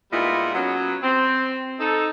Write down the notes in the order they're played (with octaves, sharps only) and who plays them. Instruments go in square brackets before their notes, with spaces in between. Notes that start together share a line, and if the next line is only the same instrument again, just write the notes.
[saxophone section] A#2 G3 G#3 B3 D#4 E4
F#3 B3 C#4
C4
D#4 A4